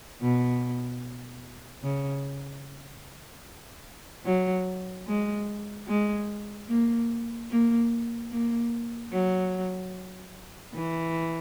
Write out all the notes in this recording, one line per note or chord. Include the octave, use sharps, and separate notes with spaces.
B2
C#3
F#3
G#3
G#3
A#3
A#3
A#3
F#3
E3